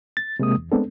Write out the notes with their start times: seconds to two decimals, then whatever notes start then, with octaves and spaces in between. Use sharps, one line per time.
0.17 A6
0.39 C3 G#3 A#3 D#6
0.57 E2
0.72 G#3 A3 B3 C4 D4 A4